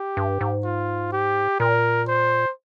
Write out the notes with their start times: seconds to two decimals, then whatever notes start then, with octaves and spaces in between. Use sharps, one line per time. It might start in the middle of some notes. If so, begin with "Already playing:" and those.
Already playing: G4
0.17 G2
0.41 G#2
0.64 F4
1.12 G4
1.60 A#2 A#4
2.08 C5